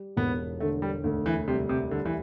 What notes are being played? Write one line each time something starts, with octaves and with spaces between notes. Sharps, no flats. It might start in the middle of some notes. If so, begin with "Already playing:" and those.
Already playing: G3
E1 B3
D3 A3
G3
D2
E3
C3 G3
C3
D3 G3
E3